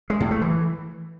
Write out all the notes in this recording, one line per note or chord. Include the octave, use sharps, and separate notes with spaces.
G#3
A2
A3
E3